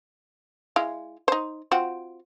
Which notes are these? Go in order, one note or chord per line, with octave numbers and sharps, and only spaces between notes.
G#3 E4 F5
D#4 C5
C4 F4 F#4